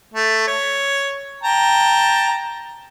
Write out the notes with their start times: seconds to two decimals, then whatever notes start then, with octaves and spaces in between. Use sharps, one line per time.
0.14 A3
0.48 C#5
1.43 G5 A5 A#5